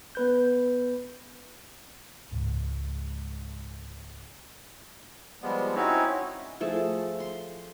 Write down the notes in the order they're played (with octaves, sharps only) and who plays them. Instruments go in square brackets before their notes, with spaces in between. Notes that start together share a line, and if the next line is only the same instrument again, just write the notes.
[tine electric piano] B3 B4 G6
[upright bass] C#2 G#2
[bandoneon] F3 G3 G#3 B3
C4 C#4 D#4 E4 F#4 C#5
[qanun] F3 A3 G#4 A4
C6